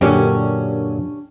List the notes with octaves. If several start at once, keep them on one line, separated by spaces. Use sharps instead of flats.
F#2 A#2 D3 C#4 D4 G4